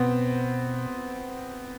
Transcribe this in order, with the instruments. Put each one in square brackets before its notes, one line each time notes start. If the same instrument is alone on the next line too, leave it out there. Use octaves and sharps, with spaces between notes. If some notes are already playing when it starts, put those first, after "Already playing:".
Already playing: [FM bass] B2 [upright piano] B3 C4